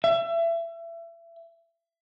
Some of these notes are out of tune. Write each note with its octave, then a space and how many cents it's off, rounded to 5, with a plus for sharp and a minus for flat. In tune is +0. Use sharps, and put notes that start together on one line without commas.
E5 +30